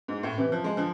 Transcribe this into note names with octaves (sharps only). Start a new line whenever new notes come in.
G#2
A2
C3 E3
F3
G#3
D3 F3